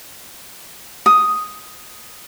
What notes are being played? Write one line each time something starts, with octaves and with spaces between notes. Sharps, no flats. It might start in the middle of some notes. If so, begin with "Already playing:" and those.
D#6